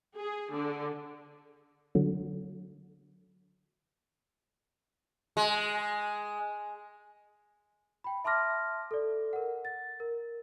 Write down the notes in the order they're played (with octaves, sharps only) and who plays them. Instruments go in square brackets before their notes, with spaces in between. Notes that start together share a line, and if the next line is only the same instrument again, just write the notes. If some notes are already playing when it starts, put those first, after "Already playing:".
[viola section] G#4
D3
[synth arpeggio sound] D3 F#3
[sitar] G#3
[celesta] G5 B5
E5 A5 C6 D6 F6 A#6
A4 D5
A#4 F#5
A6
A#4